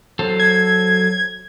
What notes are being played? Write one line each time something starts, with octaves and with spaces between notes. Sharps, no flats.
F#3 A4 C5
G#6